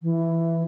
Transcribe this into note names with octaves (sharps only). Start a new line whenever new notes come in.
E3